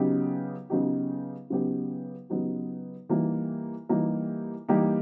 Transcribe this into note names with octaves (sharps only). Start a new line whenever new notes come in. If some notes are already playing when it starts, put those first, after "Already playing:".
Already playing: C#3 F#3 B3 D#4 G4
C#3 F#3 B3 D#4 G4
C#3 F#3 B3 D#4 G4
C#3 F#3 B3 D#4 G4
E3 G3 A#3 D#4 G4
E3 G3 A#3 D#4 G4
E3 G3 A#3 D#4 G4